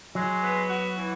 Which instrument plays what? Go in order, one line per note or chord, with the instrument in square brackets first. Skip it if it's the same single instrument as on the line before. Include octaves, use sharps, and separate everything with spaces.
[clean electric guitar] F#3 [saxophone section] G#3
[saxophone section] B3
F#4
E3